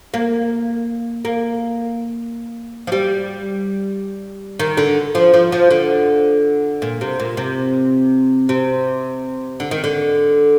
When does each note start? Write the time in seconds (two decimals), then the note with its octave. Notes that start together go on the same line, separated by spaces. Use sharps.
0.14 A#3
1.25 A#3
2.87 F3
2.92 G3
4.60 D#3
4.77 D3
5.15 F3
5.34 F3
5.52 F3
5.71 D3
6.82 A#2
7.01 C3
7.19 A#2
7.37 C3
8.49 C3
9.60 D3
9.71 D#3
9.84 D3